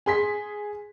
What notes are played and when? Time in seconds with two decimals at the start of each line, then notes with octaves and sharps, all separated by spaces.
0.06 G#4 C6 B6